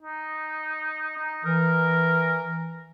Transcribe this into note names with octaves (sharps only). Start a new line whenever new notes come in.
D#4
D#4
E3 A#4